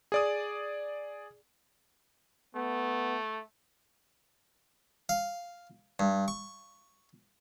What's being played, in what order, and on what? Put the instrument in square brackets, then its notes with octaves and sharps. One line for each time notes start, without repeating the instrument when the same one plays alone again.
[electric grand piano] G#4 D5 D#6
[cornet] A3 [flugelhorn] B3
[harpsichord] F5
G2
C#6